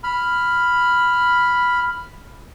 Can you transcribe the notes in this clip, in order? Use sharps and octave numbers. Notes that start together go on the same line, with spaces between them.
B5 F6